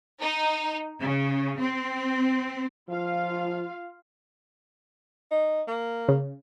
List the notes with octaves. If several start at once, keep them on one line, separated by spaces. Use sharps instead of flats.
D#4
C#3
C4
F3 F4 F5
D#4
A#3
C#3